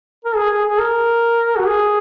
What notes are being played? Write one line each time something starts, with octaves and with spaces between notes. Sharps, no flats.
A#4
G#4
G#4
G#4
A#4
F#4
G#4